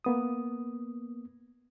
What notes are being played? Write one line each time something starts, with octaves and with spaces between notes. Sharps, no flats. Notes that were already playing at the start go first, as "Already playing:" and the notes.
A#3 B3 D#6